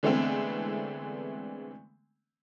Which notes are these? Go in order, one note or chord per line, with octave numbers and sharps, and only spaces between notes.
D3 E3 G#3 A3 B3 C4